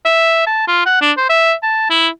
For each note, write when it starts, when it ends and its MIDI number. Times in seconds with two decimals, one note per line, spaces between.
0.05 0.44 76
0.47 0.67 81
0.68 0.86 65
0.86 0.99 78
1.01 1.12 62
1.17 1.29 72
1.29 1.54 76
1.63 1.87 81
1.90 2.08 64